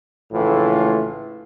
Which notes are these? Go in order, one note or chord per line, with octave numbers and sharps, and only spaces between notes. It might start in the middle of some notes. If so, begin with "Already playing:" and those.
A#1 A2 C#3 E3 A3 F4